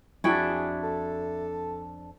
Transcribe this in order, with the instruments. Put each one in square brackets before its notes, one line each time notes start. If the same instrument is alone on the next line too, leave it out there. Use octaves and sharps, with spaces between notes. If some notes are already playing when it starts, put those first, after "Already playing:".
[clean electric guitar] F2 D4 [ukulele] E4 F#4 G5 [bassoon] G#4
[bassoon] A4